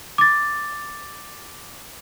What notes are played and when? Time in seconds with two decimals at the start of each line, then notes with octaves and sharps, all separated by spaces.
0.18 D6 A6